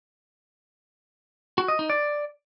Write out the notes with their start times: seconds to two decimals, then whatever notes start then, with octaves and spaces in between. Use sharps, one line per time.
1.58 F#4
1.68 D#5
1.79 D#4
1.90 D5